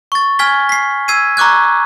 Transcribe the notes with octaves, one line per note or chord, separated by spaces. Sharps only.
C#6 A6
G#5 F6 G#6 B6 G7
B6 C7
E6 G#6 C7 D#7
A#5 C#6 D6 F#6 G#6